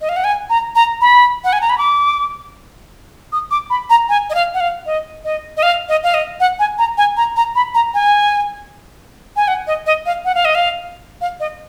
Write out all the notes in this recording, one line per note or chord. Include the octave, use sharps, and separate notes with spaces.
D#5
F5
F#5
G#5
A#5
A#5
B5
F#5
G#5
A#5
B5
D6
D#6
D6
B5
A#5
G#5
D#5
F5
F#5
F5
D#5
D#5
D#5
F5
D#5
F5
D#5
F#5
G#5
A#5
G#5
A#5
A#5
B5
A#5
G#5
G#5
F#5
D#5
D#5
F5
F#5
F5
D#5
F5
F5
D#5